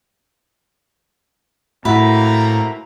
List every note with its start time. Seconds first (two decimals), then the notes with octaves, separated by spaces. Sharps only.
1.85 A2 A#3 C4 E4 F#4 B4 A#5